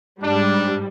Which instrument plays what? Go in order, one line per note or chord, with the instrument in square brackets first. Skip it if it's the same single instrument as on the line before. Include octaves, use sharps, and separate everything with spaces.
[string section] G#2 G3 [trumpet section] D4